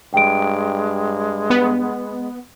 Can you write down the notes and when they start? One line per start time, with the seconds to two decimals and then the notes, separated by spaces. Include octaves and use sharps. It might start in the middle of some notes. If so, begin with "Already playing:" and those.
0.14 G2 G#3 G5 D7
1.50 B3